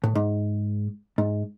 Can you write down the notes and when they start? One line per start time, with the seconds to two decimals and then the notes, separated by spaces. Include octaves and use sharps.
0.04 A2
0.15 G#2
1.18 G#2